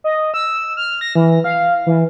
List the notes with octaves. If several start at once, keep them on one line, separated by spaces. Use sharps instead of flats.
D#5
E6
F6
A#6
E3
F5
E3